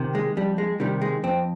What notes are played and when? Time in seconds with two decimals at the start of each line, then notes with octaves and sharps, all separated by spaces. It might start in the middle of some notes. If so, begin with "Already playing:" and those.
Already playing: C3 D#3
0.15 G#3
0.37 F2 G3
0.58 G#3
0.80 C3 D#3 G3
1.01 G#3
1.23 F2 C4